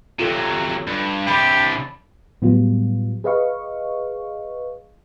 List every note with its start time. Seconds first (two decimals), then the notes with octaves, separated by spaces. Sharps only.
0.20 C3 F#3 F4 A4
0.87 G2
1.27 C3 D4 G4 B5
2.42 A2 F#3 G3 B3 F4
3.24 G#4 B4 D#5 F5 C#6